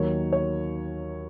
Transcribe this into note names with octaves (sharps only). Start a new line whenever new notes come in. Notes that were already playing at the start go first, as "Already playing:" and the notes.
Already playing: D#2 D#3 F#3 C#5
C#5